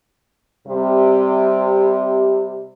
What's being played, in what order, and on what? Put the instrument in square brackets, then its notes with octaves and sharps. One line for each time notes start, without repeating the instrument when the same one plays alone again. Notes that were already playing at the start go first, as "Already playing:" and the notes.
[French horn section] C3 G3